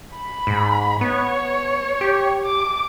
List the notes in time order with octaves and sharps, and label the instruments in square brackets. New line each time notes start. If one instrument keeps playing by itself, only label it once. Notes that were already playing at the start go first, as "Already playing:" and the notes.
[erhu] B5
[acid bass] G#2
[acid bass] B3 [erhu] C#5
[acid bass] G4
[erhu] D6